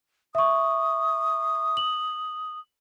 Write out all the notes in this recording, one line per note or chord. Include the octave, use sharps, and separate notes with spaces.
E5 C#6 D#6
F#7